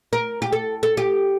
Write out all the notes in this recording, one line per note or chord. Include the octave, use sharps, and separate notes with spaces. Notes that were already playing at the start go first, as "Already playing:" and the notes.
A#4
G4
A4
A4
G4